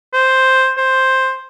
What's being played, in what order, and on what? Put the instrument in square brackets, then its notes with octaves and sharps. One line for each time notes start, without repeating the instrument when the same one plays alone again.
[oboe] C5
C5